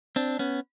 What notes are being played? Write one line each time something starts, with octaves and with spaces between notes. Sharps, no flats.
C4 D4
B3 C#4